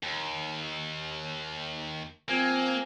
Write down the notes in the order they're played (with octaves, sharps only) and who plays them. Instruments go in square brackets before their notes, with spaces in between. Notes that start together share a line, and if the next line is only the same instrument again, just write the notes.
[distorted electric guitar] D#2
[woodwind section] F3 C4 G#5 [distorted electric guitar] A#3